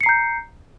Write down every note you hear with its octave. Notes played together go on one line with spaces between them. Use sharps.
A#5 G6 C7 C#7